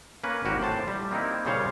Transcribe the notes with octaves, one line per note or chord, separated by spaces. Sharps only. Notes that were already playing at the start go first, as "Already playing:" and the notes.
A#3 C#4 B4
G#1 A#3 F#4 G4
A2 C5 A5
G3
A#3 C4 D#4 E4
A#2 C#3 G3 C5 C#5 F5